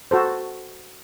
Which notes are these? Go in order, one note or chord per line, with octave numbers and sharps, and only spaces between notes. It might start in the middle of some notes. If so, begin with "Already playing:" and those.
F#4 A4 C5